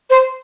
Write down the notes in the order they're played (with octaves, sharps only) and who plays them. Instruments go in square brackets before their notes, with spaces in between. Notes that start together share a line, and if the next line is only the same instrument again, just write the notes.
[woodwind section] C5